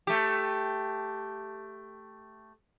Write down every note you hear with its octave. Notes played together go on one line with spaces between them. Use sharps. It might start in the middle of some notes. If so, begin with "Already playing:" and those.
A3 G4